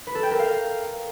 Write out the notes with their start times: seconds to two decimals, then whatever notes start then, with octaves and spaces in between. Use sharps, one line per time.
0.07 B4
0.15 A4
0.23 G5
0.31 A#4
0.39 F5